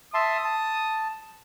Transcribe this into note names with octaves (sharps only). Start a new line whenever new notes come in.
E5 A5 C6 D#6
A5